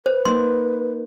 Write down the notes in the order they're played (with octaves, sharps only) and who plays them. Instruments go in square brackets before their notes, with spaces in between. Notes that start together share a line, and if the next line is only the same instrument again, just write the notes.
[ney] B4 [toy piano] C5
[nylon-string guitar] A#3 D#4 [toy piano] C6